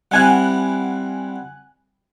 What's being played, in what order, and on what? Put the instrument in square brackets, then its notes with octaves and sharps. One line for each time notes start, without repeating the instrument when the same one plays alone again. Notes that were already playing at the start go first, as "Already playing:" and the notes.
[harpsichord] G3 C4 E4 [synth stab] F#5 G#5 F#6